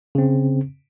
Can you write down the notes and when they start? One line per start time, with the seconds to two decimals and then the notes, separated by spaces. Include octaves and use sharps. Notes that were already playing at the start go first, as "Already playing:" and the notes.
0.15 C#3 C4